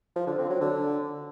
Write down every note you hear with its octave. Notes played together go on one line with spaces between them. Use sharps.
F3
D3
C4
F#3
D3